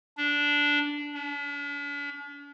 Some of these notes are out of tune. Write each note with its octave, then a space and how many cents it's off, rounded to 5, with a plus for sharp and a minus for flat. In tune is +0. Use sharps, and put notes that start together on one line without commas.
D4 -10
D4 -45